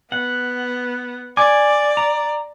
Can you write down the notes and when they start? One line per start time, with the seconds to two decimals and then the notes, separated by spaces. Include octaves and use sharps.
0.12 B3 F#5
1.37 D5 G#5 D6
1.97 A#5